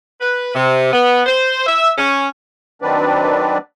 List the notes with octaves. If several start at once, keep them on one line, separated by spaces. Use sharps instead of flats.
B4
C3
B3
C5
E5
C#4
D#3 F#3 C4 D4 B4 D5